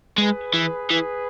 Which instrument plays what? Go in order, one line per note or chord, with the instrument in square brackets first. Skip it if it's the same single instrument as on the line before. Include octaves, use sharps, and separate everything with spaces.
[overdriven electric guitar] G#3 [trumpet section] G#4 B4
[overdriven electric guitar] E3
[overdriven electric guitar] E3 [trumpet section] G#4 B4